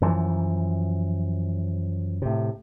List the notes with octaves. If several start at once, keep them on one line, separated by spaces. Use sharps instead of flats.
F#2 E3 F3
A2 C3